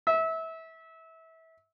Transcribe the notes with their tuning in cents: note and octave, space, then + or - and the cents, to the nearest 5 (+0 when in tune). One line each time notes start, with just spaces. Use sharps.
E5 -25